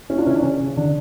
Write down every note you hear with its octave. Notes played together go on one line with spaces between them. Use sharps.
A#3 C#4 E4
D4 F4
C#3 C#4 E4
D4
C#3 C#4
C#3
D3 D4